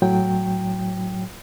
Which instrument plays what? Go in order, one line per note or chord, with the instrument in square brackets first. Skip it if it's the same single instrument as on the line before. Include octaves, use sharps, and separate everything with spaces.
[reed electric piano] A2 F#3 G5